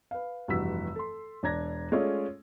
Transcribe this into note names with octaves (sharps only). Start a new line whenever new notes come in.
B4 F5
F1 G2 E3 F#4 E6 B6
A4 C6
E1 D4 A#5 G#6 A#6
G#3 A3 C#4 F4 D5